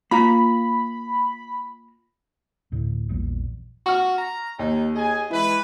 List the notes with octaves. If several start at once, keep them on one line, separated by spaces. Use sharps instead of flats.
A#3 F4 A#5 B5
D2 A2 D3
A#1 E2 A#2 G3
F#4 C#6 F6
A#5
D#2 D#4
G#4 D#5 G#5
E3 G#3 E4 B4